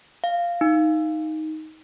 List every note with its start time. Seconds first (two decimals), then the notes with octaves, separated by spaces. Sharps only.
0.24 F5
0.61 D#4